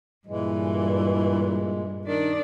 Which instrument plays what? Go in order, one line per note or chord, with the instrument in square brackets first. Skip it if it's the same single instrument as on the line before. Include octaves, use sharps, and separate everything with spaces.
[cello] G2 [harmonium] A#2 G#3 [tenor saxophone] E3
[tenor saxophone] D#3 [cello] D4 D5